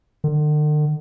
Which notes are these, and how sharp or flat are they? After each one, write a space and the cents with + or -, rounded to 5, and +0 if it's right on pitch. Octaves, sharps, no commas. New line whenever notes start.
D3 +45